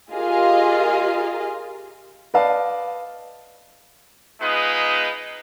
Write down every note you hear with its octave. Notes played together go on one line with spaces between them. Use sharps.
F4 G4 G#4 A#4 D#5 F5
B4 D5 D#5 F5 A5
G#3 B3 D#4 F4 B4 D#5